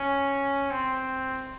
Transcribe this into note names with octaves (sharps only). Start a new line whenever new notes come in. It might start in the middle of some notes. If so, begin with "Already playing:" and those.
Already playing: C#4
C4